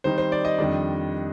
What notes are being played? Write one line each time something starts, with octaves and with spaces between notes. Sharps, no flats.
D#3 G3 C4 D#4 C5
C5
D5
D#5
F2 D#3 G3 D4